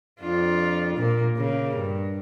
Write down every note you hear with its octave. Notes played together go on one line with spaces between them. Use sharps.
F2 D4 F4
A#2 A#3
C#3 A#3
G2